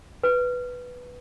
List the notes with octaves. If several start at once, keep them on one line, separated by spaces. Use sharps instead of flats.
B4